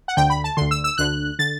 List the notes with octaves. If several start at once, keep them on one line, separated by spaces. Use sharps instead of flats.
F#5
D2 D3 G5
B5
A5
D2 D3 C6
E6
E6
D2 D3 F#6
D3 A6